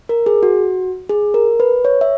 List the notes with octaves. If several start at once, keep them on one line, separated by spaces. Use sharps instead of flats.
A#4
G#4
F#4
G#4
A#4
B4
C#5
E5